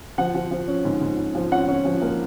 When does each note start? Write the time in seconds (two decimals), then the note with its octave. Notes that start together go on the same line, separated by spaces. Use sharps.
0.18 F3 F#5
0.34 F3
0.51 F3
0.68 C#4
0.85 G#2
1.01 G#2
1.18 C#4
1.35 F3
1.51 C#4 F#5
1.68 C#4
1.85 F3
2.02 A#3